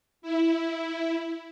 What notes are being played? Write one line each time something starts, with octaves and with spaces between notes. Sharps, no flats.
E4